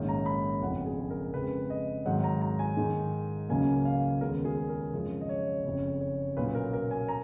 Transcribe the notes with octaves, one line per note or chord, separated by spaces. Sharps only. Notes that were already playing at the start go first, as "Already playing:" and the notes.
Already playing: A#1 G#2 D#3 A#3 C#4
A#5
B5
F#1 F2 F3 B3 F#5
G#4
A#4
F2 C#3 G#3 B4
D#5
G#1 G#2 D#3 F#3 F#5
A#5
A#5
G#5
G#2 D#3 G#3
C#2 C#3 F#3 A#3 G#5
F5
D#2 C#3 G#3 B3 A#4
G#4
A#4
G#1 F#2 C#3 F3 G#3
D#5
C#5
F#1 F2 C#3 C#5
C#5
B1 A#2 F#3 A#3 C#4 B4
A#4
A#4
G#5
A#5